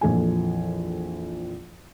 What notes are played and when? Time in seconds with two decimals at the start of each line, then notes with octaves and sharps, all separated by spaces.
0.01 A#1 F2 E3 A4 G#5